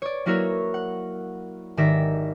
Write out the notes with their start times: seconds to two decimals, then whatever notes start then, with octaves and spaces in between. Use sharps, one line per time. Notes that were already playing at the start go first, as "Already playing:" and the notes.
0.02 C#5 D5
0.26 F#3 A#3 E4 F#4 A#4 C#5
0.74 F#5
1.77 G#1 D#3 G4 D5 E5 A#6